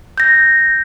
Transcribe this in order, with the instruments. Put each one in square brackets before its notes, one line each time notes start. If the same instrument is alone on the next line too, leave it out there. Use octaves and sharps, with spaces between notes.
[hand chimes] G6 A#6